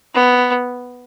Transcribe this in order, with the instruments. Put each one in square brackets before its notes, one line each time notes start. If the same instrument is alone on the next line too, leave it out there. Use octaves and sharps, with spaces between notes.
[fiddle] B3